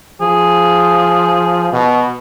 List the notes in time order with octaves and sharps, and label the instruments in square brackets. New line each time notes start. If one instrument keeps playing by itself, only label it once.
[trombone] F3 [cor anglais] G#4
[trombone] B2